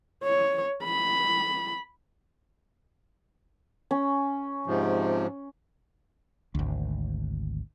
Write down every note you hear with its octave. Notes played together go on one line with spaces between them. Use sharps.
C#5
B5
C#4
G#2 C3 F3
G#1 D2